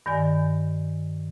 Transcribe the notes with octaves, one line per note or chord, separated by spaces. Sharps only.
G2 D#3 D5 G#5